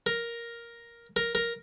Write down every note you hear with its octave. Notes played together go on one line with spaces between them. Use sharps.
A#4
A#4
A#4